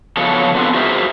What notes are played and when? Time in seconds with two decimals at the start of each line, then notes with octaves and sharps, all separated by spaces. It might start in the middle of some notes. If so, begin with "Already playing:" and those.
0.17 C#3 F3 F#3 B3 A4 C#5
0.55 B3 C4 D4 F4 A4 B4
0.74 F#4 G#4 A#4 C5 E5